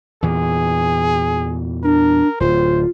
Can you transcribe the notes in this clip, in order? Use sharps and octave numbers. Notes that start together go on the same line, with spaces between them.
E2 A#2 E3 G#4
D4 A#4
D1 F4 C5